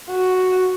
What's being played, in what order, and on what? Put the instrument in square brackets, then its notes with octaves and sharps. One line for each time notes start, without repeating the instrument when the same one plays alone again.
[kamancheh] F#4